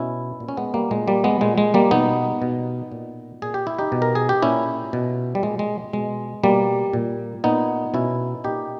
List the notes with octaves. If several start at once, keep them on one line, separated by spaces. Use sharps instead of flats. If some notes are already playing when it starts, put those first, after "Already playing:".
Already playing: B2 C#4 E4
A#2
C#4
G#3 B3
G3 A#3
A#2 G#3
G3 A#3
G#3 B3
A#2 G#3
G#3
G3 A#3
B2 B3 D#4
B2
A#2
A#2 G#4
G4
E4
D#4 G4
B2
A#4
G#4
G4
A#2 C#4 E4
B2
G3
A#2 G#3
G#3
B2 G#3
B2 G3 A#3
A#2
A#2 B3 D#4
B2 C#4 E4
A#2 D#4 G4